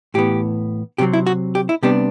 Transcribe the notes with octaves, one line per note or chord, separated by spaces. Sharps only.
A2 E3 B3 G4
C3 F#3 C4 G4
E4
F#4
G4
E4
C3 G3 B3 D4 G4